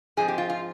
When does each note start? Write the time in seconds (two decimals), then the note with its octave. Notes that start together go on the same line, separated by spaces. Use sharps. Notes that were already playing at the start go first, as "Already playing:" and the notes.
0.17 G#2 F3 G#3 C4 G#4
0.28 G4
0.38 F4
0.49 F4